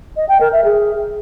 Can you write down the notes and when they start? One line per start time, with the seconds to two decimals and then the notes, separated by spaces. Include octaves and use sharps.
0.17 D#5
0.29 G5
0.40 A#4
0.52 E5
0.64 G#4